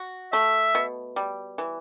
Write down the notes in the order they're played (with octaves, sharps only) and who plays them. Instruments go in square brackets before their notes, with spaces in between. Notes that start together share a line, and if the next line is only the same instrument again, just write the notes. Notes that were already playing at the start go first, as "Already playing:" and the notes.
Already playing: [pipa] F#4
[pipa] A3 [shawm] E5
[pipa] B2
G3
E3